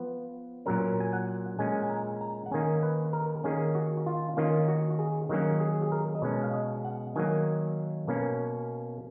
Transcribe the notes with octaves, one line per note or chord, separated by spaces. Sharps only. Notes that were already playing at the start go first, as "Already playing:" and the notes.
Already playing: F3 B3
A#2 F#3 C#4 A#4
G#5
F#5
A#2 G#3 C#4 G#5
G#5
A#5
A#5
F#5
D#3 A#3 C#4 G#5
B4
A#4
D#3 A#3 C#4 G#4
F#4
F4
D#3 A#3 C#4 F4
F#4
G#4
D#3 F#3 A#3 C#4 F#4
G#4
G#4
A#4
D#5
B2 G#3 C#4 C#5
F5
D#5
F#5
D#3 F#3 A#3 G#5
B2 A#3 C#4